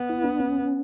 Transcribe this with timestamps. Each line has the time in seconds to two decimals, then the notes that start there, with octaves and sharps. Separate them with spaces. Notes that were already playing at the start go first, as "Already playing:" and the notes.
Already playing: B3
0.09 E4
0.24 D4
0.40 C#4